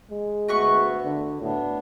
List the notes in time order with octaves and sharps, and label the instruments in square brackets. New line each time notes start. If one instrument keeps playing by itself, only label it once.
[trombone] G#3
[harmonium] D2 A3 B3 [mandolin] F#4 B4 C#6
[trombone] D3
[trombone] A2 [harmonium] B3 D4